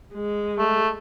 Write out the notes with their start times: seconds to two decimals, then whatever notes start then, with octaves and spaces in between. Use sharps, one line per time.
0.15 G#3
0.58 A3